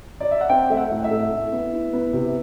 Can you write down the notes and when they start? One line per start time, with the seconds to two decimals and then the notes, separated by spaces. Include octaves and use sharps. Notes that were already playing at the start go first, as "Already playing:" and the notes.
0.20 D5
0.31 E5
0.41 F#5
0.49 C4 G5
0.70 A3 E5
0.77 F#5
0.91 A2
1.04 E5
1.11 A3
1.32 E4
1.52 B3
1.73 E4
1.93 B3
2.13 C3